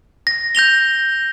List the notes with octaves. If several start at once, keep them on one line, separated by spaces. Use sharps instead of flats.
A#6
G6 A#6 F7 G7